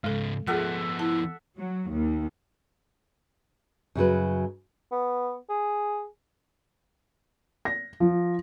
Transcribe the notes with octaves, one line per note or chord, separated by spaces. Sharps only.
G#2 C#3 G#3 A4
F3 B3 F4 G#4 A4 E5 F#5
E4 A5
F#3
D#2
F#2 C#3 F#3 B4
B3
G#4
A#6
F3